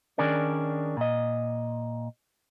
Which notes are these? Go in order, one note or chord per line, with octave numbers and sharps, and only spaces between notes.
D#3 C#4 D4 G#4 A#4 D5
A#2 D#5